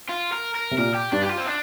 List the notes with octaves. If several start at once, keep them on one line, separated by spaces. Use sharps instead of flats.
F4
A#4
A#4
C3
A#2 A#4
G4
G2 D4
G4
F4
C4
D4